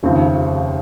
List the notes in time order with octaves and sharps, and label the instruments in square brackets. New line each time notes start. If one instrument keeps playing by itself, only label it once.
[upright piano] F1 D#2 C#3 F3 C4